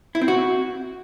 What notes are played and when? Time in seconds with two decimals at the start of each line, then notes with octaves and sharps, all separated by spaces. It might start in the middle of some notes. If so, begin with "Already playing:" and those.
0.15 E4
0.21 C4
0.28 F#4